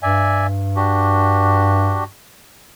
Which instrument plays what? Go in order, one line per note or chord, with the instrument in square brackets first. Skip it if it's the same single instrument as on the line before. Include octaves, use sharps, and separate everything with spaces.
[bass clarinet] G2 [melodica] D5 E5 G#5
[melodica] D4 F#4 G4